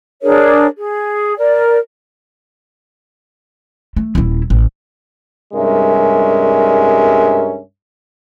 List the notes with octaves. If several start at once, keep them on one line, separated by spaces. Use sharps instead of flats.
D4 G#4 A#4 C#5
G#4
A#4 D5
A3
D#1 E4
A1
C2 G2 G#3 C#4 A#4 E5